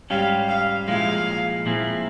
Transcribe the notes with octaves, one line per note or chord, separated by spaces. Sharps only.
G#2 G3 C#4 G4 F5
F5
A#2 F3 G#3 E4 F5
A#2 F3 C4 E4 G#4